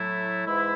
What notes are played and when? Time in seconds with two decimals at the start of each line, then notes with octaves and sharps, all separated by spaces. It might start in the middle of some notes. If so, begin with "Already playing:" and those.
Already playing: A2 F#3 A3 E4
0.46 G#2 E3 G#3 E4